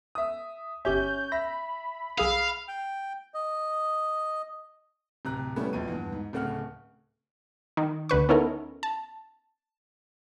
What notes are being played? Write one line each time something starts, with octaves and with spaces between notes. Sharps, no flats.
E5 D#6
G1 C#4 G4 E5 G6
E5 B5 A#6
B1 G#4 F5 E6
G5
D#5
D1 C3 A#5 F#6
G3 A3 B3 C#4 E4
A#1 F2 B2 D#7
E2 G2
G#2
D1 C#3 A3 F#5 F6
D#3
D2 D3 B4 C#6
B3 C#4 D#4 E4 A4 A#4
A5